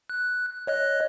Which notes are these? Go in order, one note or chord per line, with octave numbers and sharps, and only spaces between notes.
F#6
C#5 D#5 F#6